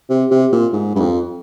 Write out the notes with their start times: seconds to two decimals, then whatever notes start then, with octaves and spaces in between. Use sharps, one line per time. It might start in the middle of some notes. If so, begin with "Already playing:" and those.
0.10 C3
0.31 C3
0.52 A#2
0.73 G#2
0.95 G2
1.00 F2